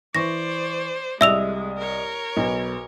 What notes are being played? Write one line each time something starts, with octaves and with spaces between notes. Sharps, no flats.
E3 C5 D5 C#6 A#6
C2 G#3 D#5 E5 D#6 E6 F7
A#4 C#5
B1 B4